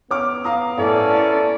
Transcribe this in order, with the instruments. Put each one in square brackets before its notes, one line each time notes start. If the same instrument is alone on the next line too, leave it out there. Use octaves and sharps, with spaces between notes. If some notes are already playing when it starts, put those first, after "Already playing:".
[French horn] B3 [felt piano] C#5 D6 F6
[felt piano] F5 A#5 D#6
[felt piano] A2 [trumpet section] A#3 C#4 D5 [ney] A4
[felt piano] E4